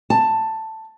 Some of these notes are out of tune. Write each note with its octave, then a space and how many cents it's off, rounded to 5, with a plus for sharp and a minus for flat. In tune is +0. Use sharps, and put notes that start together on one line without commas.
A5 +10